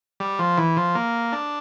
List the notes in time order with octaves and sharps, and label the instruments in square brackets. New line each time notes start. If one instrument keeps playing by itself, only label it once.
[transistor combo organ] G3
F3
E3
F3
A#3
D4